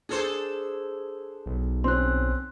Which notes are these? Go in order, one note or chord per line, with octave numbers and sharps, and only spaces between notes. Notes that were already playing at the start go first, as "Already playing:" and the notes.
D4 G#4 A4 C5
B1
C4 C#4 C6 F#6